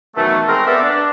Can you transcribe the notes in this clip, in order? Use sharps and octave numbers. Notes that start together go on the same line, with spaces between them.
B2 D#3 E3 F#3 A3
G#3 C4 A#4
B3 A4 D5 E5
D4